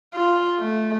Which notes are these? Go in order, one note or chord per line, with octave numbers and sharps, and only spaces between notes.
F4
A3